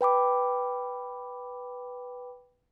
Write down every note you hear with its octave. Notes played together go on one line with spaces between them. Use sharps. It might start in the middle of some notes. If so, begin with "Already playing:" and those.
B4 G5 B5 D6